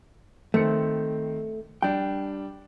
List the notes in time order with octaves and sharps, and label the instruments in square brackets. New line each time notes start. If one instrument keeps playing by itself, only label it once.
[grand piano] D#3 C4 C#7 [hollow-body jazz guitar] A3
[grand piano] G3 D4 [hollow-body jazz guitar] G5